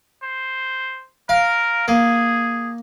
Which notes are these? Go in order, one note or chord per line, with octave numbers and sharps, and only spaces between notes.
C5
A#4 F5
A#3 G#4